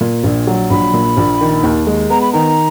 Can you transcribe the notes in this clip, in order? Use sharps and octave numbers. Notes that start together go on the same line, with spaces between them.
A#2
A#1
F#3
A#1 B5
A#2
A#1
D#3
D#2
G#3
B3 A#5
B5
D#3 A#5